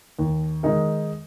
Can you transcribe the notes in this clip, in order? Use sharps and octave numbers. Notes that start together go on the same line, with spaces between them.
D#2
D#3 G#3 D#4 A#4